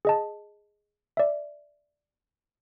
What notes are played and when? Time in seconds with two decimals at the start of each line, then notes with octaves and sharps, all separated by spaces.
0.05 G#4 D#5 A5
1.17 D5 E5